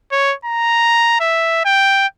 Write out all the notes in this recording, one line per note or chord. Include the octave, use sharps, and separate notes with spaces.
C#5
A#5
E5
G5